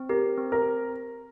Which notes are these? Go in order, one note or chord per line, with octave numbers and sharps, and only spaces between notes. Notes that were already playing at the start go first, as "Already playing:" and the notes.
Already playing: C4
G4 A#4
C4
A#4